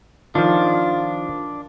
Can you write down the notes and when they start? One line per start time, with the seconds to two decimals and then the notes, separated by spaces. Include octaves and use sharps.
0.35 D#3 F3 D4 F4